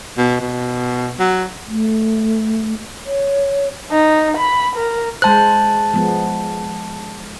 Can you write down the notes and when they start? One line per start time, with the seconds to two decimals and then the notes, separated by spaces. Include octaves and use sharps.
0.17 B2
0.41 B2
1.19 F#3
1.68 A3
3.06 C#5
3.92 D#4
4.37 B5
4.76 A#4
5.22 G#3 C5 A5 F#6
5.94 F3 G#3 B3